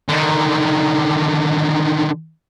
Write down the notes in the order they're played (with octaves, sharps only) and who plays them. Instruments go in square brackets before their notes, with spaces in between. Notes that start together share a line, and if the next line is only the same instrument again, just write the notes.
[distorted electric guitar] D3 D#3